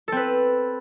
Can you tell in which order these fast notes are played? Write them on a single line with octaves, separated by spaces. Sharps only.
A4 C4 B4